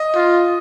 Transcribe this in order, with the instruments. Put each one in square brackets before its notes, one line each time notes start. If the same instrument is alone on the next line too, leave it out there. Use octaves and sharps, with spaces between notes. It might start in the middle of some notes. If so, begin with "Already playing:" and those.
Already playing: [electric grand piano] D#5
[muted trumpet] F4